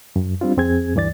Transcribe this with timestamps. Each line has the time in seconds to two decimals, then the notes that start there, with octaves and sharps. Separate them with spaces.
0.16 F#2
0.41 G3 C4 D4 F4
0.57 F2 C4 G#4 G#6
0.95 D2 G2 E3 D5 A6